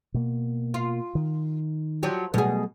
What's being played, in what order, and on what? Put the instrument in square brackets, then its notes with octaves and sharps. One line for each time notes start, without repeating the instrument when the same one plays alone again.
[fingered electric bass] B2 A#3
[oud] F4
[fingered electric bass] D#3
[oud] F3 F#3 G4
[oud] B2 G#4 [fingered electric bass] F#3 G3 A3